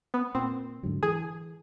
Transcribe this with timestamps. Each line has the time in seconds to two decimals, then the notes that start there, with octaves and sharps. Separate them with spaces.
0.14 B3
0.35 A#2 C4
0.83 G#2 D3 F#3
1.03 E3 G#4